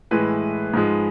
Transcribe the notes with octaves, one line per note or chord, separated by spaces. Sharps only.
A2 E3 G#3 B4
G#2 F3 G#3